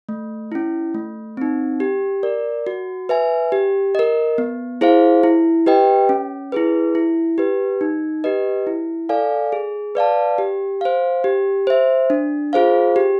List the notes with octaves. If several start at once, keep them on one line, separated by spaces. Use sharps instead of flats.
A3
C#4 E4
A3
C4 D#4
G4
A#4 D5
F#4
B4 E5 G#5
G4
A#4 D#5
B3
E4 G#4 C5 F5
E4
G4 B4 D#5 G5
C#4
E4 G#4 B4
E4
G4 B4
D#4
G4 B4 D#5
E4
A4 D5 F5 G#5
G#4
B4 D5 F5 A5
G4
C5 F5
G4
C5 E5
D4
F4 G#4 C5 F5
G4